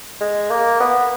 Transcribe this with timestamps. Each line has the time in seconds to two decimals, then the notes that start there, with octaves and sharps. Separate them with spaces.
0.21 G#3
0.50 A#3
0.80 B3